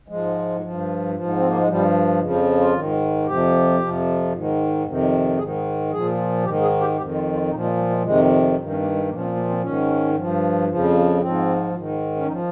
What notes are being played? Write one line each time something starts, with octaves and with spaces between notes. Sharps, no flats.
G#2 F3 G#3
G2 F3
G#2 F3
C4
A#3
G#3
G2 F3 G3
F2 C#3 F3 G#3
C#4
F4
G#2 D#3
F2 C3 F3 G4
F2 C3 F3
G#2
D#3
F2 C3 D#3
G#2 D#3 G#4
A#2 F3 G#4
G#2 D#3 G4
G#4
G4
F2 D#3 G4
F4
F4
A#2 F3 D#4
G#3
G3
G#3
F2 C3 D#3 G#3
G2 D#3 C4
C#4
A#3
G#3
A#2 F3 A#3
C#4
C4
A#3
C4
G#2 D#3 C#4
G2 F3
F2 C#3 F3
G#2 F3 C4
G#2 D#3
C#4
F3 D#4